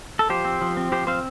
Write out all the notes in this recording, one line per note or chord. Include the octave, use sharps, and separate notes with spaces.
A4
F3 G4 C5
C4
F3
C4
F3 G4 C5
C4 C5 F5